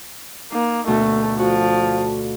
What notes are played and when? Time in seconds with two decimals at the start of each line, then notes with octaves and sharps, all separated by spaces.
0.52 A#3 D#4
0.87 D2 B2 A3
1.39 F3 F#4